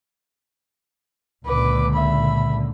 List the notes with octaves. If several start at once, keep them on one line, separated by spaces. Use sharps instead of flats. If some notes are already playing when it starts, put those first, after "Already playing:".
C#2 A#2 D3 B4 D6
E5 B5